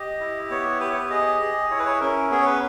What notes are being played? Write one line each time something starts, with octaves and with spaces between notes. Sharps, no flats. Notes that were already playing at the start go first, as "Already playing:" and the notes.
Already playing: G4 D#5
E4
B3 C#5
G4 B4
C#5
B4
G#4 D#5
G#4
E4 C#5
B4
C#5
C#4 A#4
B3 G#4
C#5
B4